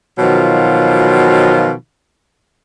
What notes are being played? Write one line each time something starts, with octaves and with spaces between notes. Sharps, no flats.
B2 D#3 F3 F#3 F4